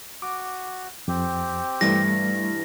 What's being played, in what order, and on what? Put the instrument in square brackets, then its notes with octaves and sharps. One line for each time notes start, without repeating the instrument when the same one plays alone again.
[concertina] F#4 [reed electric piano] D6
[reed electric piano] F2 [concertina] C4 G4
[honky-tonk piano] G2 E3 [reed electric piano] G3 A3 [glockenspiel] A#6